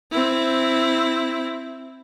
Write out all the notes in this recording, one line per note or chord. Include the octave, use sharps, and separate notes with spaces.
C4 E4